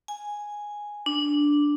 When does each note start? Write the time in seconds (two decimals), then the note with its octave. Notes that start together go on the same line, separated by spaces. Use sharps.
0.08 G#5
1.06 D4